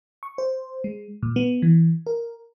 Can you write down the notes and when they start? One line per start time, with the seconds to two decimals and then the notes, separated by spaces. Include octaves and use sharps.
0.23 C#6
0.38 C5
0.84 G#3
1.23 A#2
1.36 B3
1.62 E3
2.06 A#4